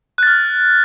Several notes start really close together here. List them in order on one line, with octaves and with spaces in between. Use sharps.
F#6 A6 F6